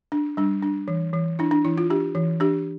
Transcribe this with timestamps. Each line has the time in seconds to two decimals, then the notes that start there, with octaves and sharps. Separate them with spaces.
0.12 D4
0.37 G3 D4
0.63 D4
0.88 E3
1.13 E3
1.39 D4 E4
1.51 D4
1.65 E3 E4
1.78 F4
1.90 D4 G4
2.15 E3
2.40 D4 G4